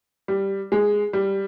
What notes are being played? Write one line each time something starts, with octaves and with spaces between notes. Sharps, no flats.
G3
G#3
G3